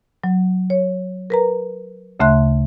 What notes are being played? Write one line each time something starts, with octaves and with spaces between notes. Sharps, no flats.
F#3
C#5
A#4 B4 A#5
D2 C#3 A3 E5 C6 F#6